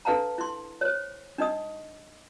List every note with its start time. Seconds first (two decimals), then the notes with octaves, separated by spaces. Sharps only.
0.05 D4 A4 B4 F5 A5 A#5
0.38 E4 C6
0.81 C5 C#5
1.38 D4 D#4 D#5 D#6